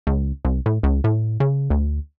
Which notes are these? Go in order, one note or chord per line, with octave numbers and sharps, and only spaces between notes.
C#2
C2
A2
C#2
A2
C#3
D2